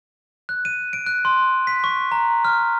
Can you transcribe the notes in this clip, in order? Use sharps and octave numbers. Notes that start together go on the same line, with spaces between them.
F#6
D#7
D7
F#6
C6
B6
C#6
A#5
F6